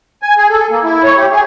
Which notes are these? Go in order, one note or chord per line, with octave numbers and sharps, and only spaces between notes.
G#5
G#4
A4
A#3
E4
C#5
G4
G#4